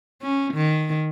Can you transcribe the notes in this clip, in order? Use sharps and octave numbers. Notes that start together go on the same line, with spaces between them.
C#4
D#3